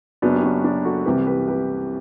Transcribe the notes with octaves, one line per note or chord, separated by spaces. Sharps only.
F#1 F#2 F#3 B3 D4
G4
D4 F#4
D4 F#4
F#4 A4
C2 C3 E3 G4 B4
G4 B4
G4 B4